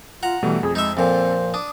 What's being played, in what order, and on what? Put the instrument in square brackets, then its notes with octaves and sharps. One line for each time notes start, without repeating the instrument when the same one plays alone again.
[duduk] F4 [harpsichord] F#5 A#5
[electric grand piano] B2 G3 A3 [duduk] E3
[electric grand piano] F2 [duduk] G#4
[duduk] G#3 [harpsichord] D#4 E5
[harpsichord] F2 A#2 [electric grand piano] C4 A4 [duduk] C5
[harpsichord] D4 [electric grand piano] D#6